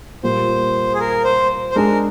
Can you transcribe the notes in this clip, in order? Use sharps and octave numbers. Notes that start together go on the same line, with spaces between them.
A#2 G3 A#3 C5
G#4
A#4
C5
C5
G#3 D4 G#4 A#4